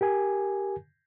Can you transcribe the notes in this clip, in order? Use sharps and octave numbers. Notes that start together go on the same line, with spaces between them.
G4 A#4 G#5